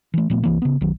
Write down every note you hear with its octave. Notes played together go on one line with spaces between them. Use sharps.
E3 A3
A#2 F3 A3 B3
C2 E3 A#3
C#3 B3
B1 D#3 F#3